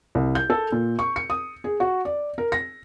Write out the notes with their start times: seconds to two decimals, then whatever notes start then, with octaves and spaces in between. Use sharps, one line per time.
0.15 C2
0.35 G6
0.50 A4
0.72 A#2
0.99 C#6
1.16 C#7
1.30 D#6
1.64 G#4
1.80 F#4
2.05 D5
2.38 A#4
2.52 A#6